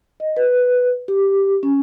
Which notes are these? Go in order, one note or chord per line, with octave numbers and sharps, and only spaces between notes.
D#5
B4
G4
C#4